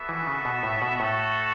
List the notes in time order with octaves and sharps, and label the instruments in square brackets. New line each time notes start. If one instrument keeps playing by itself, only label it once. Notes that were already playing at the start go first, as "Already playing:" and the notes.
Already playing: [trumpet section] B3 F#4 A4 E5
[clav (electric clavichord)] E3
C#3
B2
A2
B2
[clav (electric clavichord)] A2 [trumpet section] A3 F#4 A4